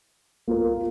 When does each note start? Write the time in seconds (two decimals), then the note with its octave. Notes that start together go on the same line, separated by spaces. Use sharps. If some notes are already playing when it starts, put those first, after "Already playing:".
0.48 A#3 F4 A#4